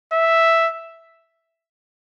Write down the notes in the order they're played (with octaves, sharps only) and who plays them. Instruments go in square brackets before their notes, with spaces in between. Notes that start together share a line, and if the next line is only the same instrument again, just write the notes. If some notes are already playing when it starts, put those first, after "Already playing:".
[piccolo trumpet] E5